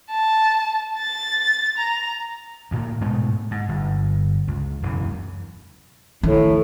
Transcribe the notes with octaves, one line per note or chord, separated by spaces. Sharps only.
A5
A6
A#5
D2 A2 A#3
G#2 B2 G#3 A3
G#2
G1
C#2
E1 F#2 E3
A2 D#3